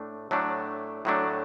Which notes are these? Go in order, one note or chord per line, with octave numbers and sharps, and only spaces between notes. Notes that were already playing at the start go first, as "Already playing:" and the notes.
Already playing: A2 A3 D4
A2 F#3 A3 D4
A2 F#3 A3 D4